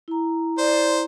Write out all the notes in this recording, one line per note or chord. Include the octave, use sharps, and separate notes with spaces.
E4 A#5
C5 D5